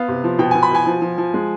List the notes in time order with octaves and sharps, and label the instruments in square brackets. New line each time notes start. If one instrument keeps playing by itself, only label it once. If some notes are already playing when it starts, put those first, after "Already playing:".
Already playing: [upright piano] B3 F5
C3
F3
B2 G5
B2 G#5
B5
B2 G#5
F3
F3
F3
G#3